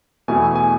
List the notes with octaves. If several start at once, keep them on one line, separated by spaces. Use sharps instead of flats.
E2 B2 A3 E4 G#5
G#5